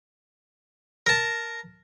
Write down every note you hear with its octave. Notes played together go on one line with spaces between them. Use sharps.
A#4 A5